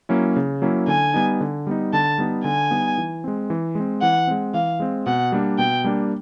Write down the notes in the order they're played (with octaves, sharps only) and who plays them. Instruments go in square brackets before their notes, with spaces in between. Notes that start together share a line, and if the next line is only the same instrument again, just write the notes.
[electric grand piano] F#3 A#3 C#4 E4
C#3
F#3 A#3 C#4 E4
[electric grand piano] D3 [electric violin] G#5
[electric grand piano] G3 B3 D#4
D3
G3 B3 D#4
[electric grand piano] D3 [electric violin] A5
[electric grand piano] G3 B3 D#4
[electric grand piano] D3 [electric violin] G#5
[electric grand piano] G3 B3 D#4
E3
G#3 C4
E3
G#3 C4
[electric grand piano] E3 [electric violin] F#5
[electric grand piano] G#3 C4
[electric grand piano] E3 [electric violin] F5
[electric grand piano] G#3 C4
[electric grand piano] B2 [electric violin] F#5
[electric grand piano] G3 A#3 D4
[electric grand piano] B2 [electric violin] G5
[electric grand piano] G3 A#3 D4